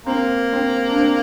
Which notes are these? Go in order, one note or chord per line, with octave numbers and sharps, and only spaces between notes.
A#3 C4
C4
D4
C4